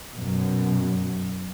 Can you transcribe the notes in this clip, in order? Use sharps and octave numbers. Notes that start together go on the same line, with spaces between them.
F#2 B2